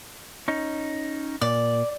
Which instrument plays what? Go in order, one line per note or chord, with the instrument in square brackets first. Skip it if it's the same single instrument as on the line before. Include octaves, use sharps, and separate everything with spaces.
[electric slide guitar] C#4 D#4
[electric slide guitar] A#2 [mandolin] D5